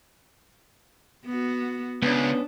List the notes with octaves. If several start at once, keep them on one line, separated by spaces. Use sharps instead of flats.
B3 F#4
C#2 B3 C#4 D4